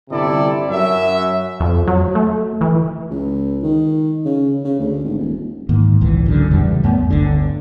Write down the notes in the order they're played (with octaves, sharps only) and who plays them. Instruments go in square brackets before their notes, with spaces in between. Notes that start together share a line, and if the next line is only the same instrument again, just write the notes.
[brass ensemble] G1 C3 G3 E4 A4 D5
F#2 F#3 E5
[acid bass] F2
F#3
A3
E3
[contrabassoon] C#2
D#3
C#3
C#3
D2
G#1
D#1
[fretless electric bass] G#2 D#3 A#3
G#1 C#2 A#2 E3
F#2 D3
A1 E2 C#3 G3
F#2 A3 B3
G1 D2 D3